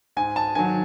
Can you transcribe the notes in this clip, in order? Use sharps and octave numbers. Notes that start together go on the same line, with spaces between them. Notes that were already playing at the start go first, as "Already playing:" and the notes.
G#2 G#5
A5
D#3 F#3 G#5